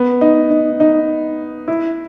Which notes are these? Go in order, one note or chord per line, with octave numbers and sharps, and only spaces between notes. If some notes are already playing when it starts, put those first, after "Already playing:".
Already playing: B3
D#4
D#4
D#4
E4